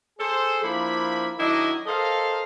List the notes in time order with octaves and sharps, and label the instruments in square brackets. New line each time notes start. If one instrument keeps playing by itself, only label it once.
[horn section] G#4 A4 C5
F3 A#3 D4 E4 B5
D#3 F#3 D4 E4 D#5
A4 A#4 C5 D#5 F5